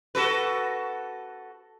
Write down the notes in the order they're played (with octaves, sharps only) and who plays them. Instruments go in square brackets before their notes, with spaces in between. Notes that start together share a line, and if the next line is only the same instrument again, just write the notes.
[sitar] F#4 A4 B4